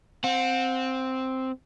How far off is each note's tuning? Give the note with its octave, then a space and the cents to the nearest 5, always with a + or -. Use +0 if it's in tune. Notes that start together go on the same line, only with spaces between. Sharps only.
C4 +0 F#5 -40